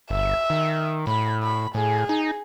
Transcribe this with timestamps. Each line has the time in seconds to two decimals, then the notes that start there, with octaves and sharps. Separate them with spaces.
0.10 G1 E5
0.50 D#3
1.07 A2 B5
1.43 B5
1.75 A2 G#4
2.09 D#4